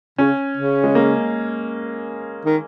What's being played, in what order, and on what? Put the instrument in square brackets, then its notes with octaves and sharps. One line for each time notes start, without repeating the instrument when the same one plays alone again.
[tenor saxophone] C#3 [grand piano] C#4
[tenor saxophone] C#3
[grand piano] G#3
A#3
[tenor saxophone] D#3